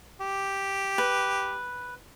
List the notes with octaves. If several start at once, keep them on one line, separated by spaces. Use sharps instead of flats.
G4
B4